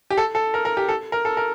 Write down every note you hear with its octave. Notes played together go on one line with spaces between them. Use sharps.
G4
A4
A4
A#4
A#4
G4
A4
A#4
A4
A#4